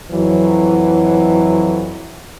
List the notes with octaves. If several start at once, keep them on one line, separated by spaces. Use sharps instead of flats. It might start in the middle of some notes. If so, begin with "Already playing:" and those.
F2 E3 F#3